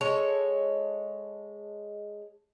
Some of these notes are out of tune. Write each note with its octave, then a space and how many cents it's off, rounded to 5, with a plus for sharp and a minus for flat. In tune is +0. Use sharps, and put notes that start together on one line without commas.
G#3 +0 A4 +0 C#5 +0